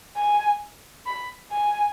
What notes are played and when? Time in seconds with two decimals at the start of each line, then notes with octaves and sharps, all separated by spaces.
0.16 G#5
1.06 B5
1.52 G#5